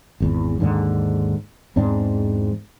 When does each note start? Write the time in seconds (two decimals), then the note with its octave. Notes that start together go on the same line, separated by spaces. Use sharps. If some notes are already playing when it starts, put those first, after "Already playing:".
0.20 G#1 E2
0.60 D#2 G#2 D3 D4
1.76 E2 G#2 C4 D4